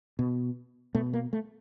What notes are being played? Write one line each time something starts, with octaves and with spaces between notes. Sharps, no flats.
B2
B2 A3
A#3
A3